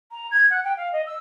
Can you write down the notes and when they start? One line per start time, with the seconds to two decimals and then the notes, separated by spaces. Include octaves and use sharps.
0.12 A#5
0.31 G#6
0.50 F#5
0.65 G5
0.77 F5
0.93 D#5
1.07 E6